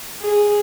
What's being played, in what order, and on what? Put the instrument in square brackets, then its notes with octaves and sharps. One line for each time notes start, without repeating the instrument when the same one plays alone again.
[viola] G#4